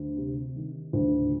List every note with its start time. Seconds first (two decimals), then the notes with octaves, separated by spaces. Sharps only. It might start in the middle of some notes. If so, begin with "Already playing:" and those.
Already playing: D2
0.17 C3
0.56 D#3
0.93 D2